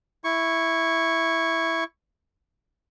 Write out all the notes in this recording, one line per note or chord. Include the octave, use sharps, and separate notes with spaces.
E4 C#6